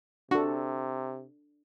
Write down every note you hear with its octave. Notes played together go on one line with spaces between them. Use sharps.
C3 D4 F#4 A4